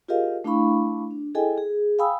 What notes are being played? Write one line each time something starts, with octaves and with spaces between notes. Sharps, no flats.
F4 G4 G#4 A#4 D#5 F5
A3 D4 E4 F5 B5 C#6
D4
E4 G#4 A4 D#5 G5 G#5
G#4
F5 G5 G#5 B5 D#6 E6